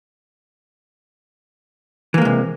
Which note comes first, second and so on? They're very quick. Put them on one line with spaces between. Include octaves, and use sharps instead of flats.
E3 A#3 G#3 C3